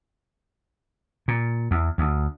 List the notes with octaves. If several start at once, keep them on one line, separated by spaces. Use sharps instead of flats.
A#2
E2
D2